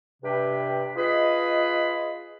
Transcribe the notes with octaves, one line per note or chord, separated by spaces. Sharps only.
G2 C3 B4 G5
F4 G#4 B4 D#5